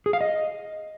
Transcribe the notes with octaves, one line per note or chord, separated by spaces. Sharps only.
G#4
F5
D#5